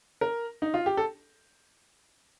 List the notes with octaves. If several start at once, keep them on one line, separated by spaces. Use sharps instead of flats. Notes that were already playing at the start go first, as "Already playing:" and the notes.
A#4
D#4
F4
G4
A4